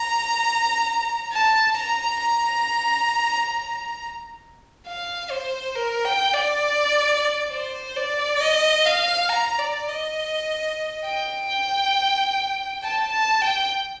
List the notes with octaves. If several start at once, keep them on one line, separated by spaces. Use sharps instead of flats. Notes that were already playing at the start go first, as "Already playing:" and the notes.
Already playing: A#5
A5
A#5
A#5
F5
C5
A#4
G5
D5
C5
D5
D#5
F5
A#5
D5
D#5
G5
A5
A5
G5